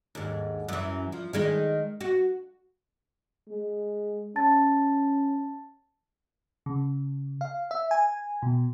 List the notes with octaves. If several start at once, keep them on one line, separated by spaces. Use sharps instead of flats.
D#2 G#2
F#2 E3
F3
D#3 G#3 D#4
F#4
G#3
C#4 A5 A6
C#3
F5
E5
G#5
B2